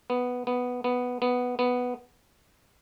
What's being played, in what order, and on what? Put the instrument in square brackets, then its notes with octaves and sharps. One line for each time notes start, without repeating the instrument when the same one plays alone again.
[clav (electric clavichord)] B3
B3
B3
B3
B3